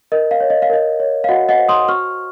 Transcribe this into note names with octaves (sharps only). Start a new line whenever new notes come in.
A#4 D#5
F5
C#5
D#5
F5
A#4 D#5
C#5
F5
F#4 D#5 F#5
D#5 F#5
C5
C6 D#6
F#4 C#6 F6